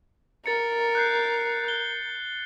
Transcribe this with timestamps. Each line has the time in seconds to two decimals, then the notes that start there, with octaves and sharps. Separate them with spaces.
0.46 A#4 A6 C#7
0.95 F#6 G6 C7
1.65 F#6 G7